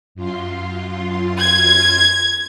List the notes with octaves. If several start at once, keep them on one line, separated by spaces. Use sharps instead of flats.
F#2 F4 C6
G#6